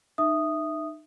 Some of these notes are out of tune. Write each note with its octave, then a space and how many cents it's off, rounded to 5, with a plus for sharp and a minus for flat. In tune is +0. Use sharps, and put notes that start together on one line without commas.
D#4 -30 E5 +0 D#6 -5